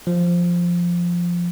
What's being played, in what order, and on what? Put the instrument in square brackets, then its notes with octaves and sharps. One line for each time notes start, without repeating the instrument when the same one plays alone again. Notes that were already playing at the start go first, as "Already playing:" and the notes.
[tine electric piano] F3